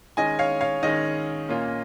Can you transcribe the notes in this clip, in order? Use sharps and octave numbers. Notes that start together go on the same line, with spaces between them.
D#3 G#3 C#4 D#5 G#5
C#5 F5
C#5 F5
D#3 G#3 C#4 D#5
A#2 A#3 C#4 F4